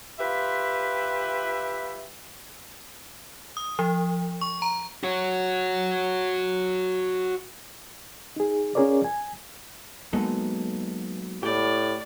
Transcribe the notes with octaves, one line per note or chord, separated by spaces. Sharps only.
F4 G4 B4 E5
D#6
F3
C#6
A#5
F#4 C#5
D#4 G#4
C#4 F4 G#4 A#4 C#5 D5
G#5
F#3 G#3 A#3 B3 D#4 A4
A2 G4 D5